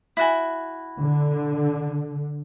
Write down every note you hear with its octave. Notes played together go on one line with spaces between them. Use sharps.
E4 F#4 G#5
D3